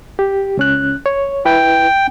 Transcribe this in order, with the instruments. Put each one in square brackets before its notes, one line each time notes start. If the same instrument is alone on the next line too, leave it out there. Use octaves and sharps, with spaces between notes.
[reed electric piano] G4
C#2 C#4 F#6
C#5
[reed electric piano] E4 B4 [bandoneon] G5